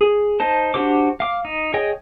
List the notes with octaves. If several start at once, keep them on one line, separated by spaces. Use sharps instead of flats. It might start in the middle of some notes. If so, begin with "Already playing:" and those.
G#4
D#4 C5 A5
D4 F#4 G4 C5 D6
F5 D6
D#4
G#4 C#5 D#5 G5